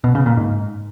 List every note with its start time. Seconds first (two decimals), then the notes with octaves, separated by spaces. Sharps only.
0.04 B2
0.15 C#3
0.26 A#2
0.37 G#2